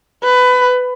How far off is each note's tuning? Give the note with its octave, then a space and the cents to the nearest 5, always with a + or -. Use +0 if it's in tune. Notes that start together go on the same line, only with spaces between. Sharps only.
B4 +20